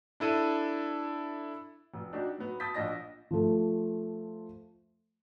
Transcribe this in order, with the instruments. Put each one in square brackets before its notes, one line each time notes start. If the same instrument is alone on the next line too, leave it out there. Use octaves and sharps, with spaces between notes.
[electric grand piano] D4 E4 A4 D#7
[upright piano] F1
D4 D#4 F#4 G4
F#3 B3
A5 D#6 G6 A6 B6
A#1 D4 D#5 A#6
[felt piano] F3 A3